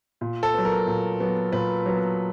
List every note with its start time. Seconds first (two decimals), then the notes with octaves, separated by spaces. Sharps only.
0.21 A#2
0.43 A4
0.54 F#3 B3
0.65 A#4
0.87 A#2
1.20 F#3 B3
1.53 A#2 B4
1.86 F#3 B3